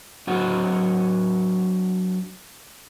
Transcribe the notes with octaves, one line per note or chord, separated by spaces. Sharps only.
F#3 D4 F#4 C5 D#5 F#5